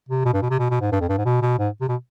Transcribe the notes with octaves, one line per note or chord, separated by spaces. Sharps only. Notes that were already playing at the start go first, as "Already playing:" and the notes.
C3
B2
G2
B2
C3
B2
B2
G#2
G2
F2
G2
G#2
B2
B2
G#2
C3
B2